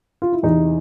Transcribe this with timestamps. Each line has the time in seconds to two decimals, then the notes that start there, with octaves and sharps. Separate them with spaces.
0.22 F4
0.32 E4
0.43 E2 C3 E3 D#4